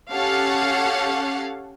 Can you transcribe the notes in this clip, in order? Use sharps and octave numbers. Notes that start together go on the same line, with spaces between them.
C#4 G4 A4 F5 F#5